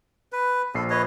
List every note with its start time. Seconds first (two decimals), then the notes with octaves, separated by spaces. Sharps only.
0.33 B4
0.75 A#1 A4 C7
0.90 B4 C#5 D#5